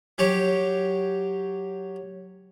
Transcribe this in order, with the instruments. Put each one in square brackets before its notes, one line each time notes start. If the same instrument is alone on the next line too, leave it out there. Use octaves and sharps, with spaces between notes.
[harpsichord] F#3 G4 C#5